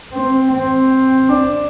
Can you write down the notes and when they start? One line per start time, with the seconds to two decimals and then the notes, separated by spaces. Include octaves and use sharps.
0.13 C4
0.52 C4
1.30 D4